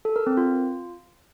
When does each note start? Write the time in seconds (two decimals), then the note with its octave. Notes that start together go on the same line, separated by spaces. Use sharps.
0.05 A4
0.16 A#4
0.27 C4
0.37 F4